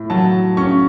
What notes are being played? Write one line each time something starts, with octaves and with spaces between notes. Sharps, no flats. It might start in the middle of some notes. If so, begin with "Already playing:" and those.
Already playing: A2
F#3 A5
C#4 C#6